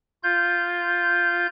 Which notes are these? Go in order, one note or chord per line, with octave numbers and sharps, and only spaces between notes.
F4 G6